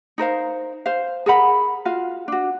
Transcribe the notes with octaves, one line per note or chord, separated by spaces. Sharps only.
D#4 A#4 C5 F5
C5 F5
G#4 A#4 F#5 B5
F4 F#4 F5
D4 F#4